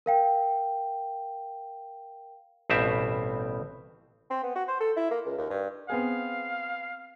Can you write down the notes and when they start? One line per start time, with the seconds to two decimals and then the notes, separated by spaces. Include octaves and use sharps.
0.06 A#4 F5 G5
2.70 A1 G2 B2 C4 E5
4.30 C4
4.43 B3
4.55 F#4
4.68 C5
4.81 A4
4.97 E4
5.11 A#3
5.25 C#2
5.38 D#2
5.50 G2
5.90 B3 C4 G#4 F5